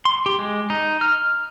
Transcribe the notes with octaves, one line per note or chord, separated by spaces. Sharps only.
C6
G4
G#3
D#4
F6